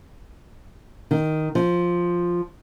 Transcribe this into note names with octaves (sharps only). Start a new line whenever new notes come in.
D#3
F3